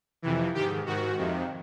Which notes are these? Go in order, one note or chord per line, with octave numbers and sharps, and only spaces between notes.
F2 C3 E3
G#2 D#3 G4
G#2 D#3 F#4
F2 C3 D#3